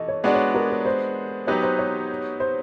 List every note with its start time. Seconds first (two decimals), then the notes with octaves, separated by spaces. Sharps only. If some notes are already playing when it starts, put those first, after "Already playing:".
Already playing: E3 A3 D#5
0.08 C#5
0.24 G#3 B3 D4 F#4 D5
0.35 C#5
0.54 A#4
0.70 B4
0.85 C5
1.47 F#3 B3 D#4 G4 B4 C#5
1.63 C5
1.79 C#5
2.40 C5